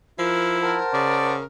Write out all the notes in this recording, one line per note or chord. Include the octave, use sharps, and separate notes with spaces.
F3 E4 A#4
A#4 C5 F#5 A5
C#3 D5